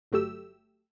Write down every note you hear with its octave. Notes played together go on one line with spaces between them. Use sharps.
G1 F#3 A3 G4 E6